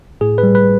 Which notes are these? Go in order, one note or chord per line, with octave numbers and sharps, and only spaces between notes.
A2 G#4
B4
G3
B4